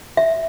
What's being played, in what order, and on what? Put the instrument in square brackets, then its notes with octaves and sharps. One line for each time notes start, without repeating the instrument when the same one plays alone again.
[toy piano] E5